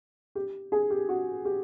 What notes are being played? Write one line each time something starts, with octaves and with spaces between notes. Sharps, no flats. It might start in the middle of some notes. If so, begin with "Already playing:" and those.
G4
G#4
G4
F#4
G4